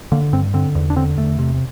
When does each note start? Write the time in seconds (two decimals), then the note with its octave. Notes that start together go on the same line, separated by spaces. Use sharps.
0.12 D3 A#3
0.33 G2 C4
0.54 D3 C4
0.75 E2
0.90 D4
0.96 D3 C4
1.17 E2 A3
1.39 C3